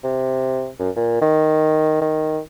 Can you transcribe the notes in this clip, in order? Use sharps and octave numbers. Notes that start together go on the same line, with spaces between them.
C3
F#2
A#2
D#3
D#3